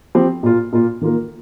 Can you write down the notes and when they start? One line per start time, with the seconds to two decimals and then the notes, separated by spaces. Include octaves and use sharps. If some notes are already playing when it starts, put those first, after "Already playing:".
0.15 F3 C4 G4
0.43 A#2 A#3 F4
0.73 A#2 A#3 F4
1.01 D#3 A#3 F4 A#4